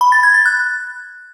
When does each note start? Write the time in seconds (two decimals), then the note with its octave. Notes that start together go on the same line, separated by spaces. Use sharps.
0.01 B5
0.12 A6
0.23 G#6
0.34 A6
0.46 F#6